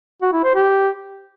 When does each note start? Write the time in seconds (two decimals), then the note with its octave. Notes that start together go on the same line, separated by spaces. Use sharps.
0.22 F#4
0.33 E4
0.44 C5
0.55 G4